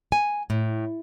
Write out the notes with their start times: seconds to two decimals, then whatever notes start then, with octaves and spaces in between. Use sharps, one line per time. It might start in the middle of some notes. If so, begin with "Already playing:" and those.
0.12 G#5
0.50 A2